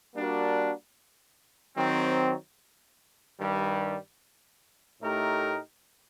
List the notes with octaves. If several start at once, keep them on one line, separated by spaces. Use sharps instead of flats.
G3 A#3 D4 F#4 A#4
D#3 F#3 C4
G2 D#3 G3
A2 A3 D#4 G4 A#4